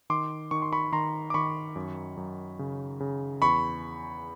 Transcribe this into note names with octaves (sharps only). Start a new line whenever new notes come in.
D#3 C6 D6
D#3 C#6
C6
B5 C#6
D#3 A#5 C6
D6
D#3 B5 C#6
F#2
F#2
C#3
C#3
E2 B5 C#6